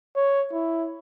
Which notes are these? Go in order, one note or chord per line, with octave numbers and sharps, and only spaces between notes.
C#5
E4